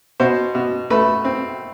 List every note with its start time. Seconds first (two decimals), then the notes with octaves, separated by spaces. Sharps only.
0.20 B2 C5
0.55 B2
0.90 A3 B4
1.25 C4